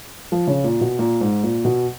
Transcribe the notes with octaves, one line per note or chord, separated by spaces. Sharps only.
F3
C#3
A#2
B2
A#2
G#2
A#2
B2